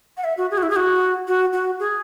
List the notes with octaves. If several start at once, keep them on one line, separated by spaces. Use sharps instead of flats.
F#5
E5
F#4
G#4
F#4
E4
G#4
F#4
F#4
F#4
G#4